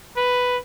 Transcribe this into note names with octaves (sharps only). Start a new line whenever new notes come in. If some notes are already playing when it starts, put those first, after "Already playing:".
B4